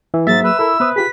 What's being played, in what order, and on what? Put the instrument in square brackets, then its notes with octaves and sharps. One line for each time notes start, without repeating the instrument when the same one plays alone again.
[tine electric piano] E3 [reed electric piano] E5
[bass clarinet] G#2 [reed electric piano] F#3 A#3 G#4 [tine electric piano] E5 [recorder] A6
[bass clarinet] B4 [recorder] E6
[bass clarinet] E4 [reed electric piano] A4 A#4
[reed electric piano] B3 C5 D#6 [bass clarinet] B4
[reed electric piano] F4 G4 G#4 [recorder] B6